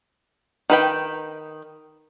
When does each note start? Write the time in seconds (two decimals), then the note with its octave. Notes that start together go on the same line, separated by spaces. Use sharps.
0.70 D#3 B4 G5